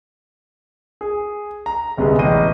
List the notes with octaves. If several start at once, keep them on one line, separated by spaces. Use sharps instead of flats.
G#4
A#5
G1 C2 C#3 G#3 B3
A1 D#5 D#7